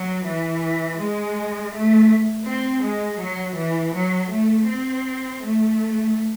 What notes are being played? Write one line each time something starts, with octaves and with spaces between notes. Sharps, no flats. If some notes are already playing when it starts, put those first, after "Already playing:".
Already playing: F#3
E3
G#3
A3
C4
G#3
F#3
E3
F#3
A3
C4
A3